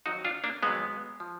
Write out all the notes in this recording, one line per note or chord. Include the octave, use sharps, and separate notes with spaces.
F2 D#3 F#3 D#4 F#4
D4 F4
A#3 D4
F2 D#3 F#3 G#3 B3
F3